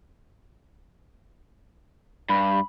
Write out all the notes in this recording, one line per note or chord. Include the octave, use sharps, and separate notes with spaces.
G2 B5